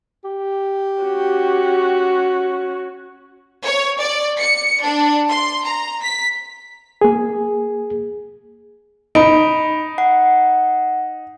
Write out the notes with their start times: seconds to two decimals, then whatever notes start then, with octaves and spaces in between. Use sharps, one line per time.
0.24 G4
1.02 C#4 F#4
3.65 C#5
4.00 D5
4.40 C#7
4.82 D4
5.29 C6
5.65 A#5
6.03 B6
7.01 A#3 G#4
9.15 D#4 B5 D7
9.98 F#5